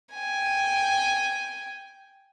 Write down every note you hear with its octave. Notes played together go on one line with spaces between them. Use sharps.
G5 G#5